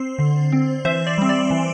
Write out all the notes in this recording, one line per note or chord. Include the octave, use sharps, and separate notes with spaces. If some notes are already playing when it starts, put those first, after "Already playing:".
Already playing: C4 C5
D3
C4
E3 C5 E5
D5
G3 C4
D5
E3